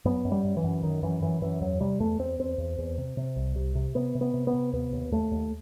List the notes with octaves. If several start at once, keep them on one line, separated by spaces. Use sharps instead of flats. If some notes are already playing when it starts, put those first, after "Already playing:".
F#2 B3
F#2
G3
F#2
E3
F#2
F#2 D#3
F#2 E3
F#2 E3
F#2 E3
E2 F#3
C3 G3
E2 A3
E2 C4
E2 C4
E2
E2
C3
C3
C2
C3
C3
C3 B3
C3
B3
C3
B3
C3
D#2 B3
D#2
D#2 A3
D#2